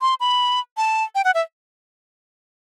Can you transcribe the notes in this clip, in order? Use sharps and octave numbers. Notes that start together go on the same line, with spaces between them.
C6
B5
A5
G5
F#5
E5